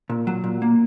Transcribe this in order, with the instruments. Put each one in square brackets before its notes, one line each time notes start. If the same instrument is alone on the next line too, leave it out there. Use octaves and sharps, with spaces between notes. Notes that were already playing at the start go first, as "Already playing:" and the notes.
[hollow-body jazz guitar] A#2
F#3
A#2
A#3